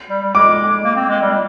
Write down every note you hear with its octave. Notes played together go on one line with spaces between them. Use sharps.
G3
G3
G#3 D6
A#3
C4
G#3
G3